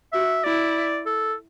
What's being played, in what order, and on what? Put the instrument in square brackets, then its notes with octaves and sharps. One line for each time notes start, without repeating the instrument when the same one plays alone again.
[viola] F#4 [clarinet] E5
[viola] E4 [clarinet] D5
[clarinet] A4